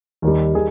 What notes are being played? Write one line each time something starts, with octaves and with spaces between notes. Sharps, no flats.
D#2 D#3 G3
D#3 G3 G#4